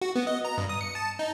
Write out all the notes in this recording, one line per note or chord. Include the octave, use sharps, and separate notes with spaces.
F#4
B3
D#5
A#5
G2
D#6
C#7
A5
D#4